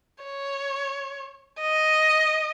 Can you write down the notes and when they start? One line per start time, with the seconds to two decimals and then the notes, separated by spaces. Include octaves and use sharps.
0.24 C#5
1.60 D#5